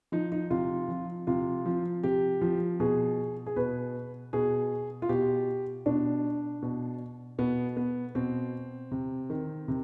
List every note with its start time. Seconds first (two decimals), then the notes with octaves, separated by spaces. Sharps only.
0.12 F3 D#4
0.32 D#4
0.50 C3 F4
0.88 F3
1.27 C3 F4
1.66 F3
2.03 C3 G4
2.41 F3
2.80 B2 G#4
3.46 G#4
3.56 B2 B4
4.33 B2 G#4
5.02 F4
5.09 B2 G4
5.86 B2 D4
6.62 B2
7.38 B2 B3
7.77 B3
8.15 B2 C4
8.91 C3
9.30 D#3
9.68 C3